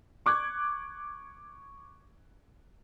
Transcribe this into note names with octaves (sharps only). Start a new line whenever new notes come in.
C#6 D6 F#6 G#6